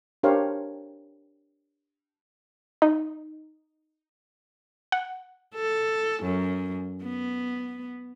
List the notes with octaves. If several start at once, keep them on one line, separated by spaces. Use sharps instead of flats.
D4 G4 A#4 C5 C#5 F5
D#4
F#5
A4
F#2
B3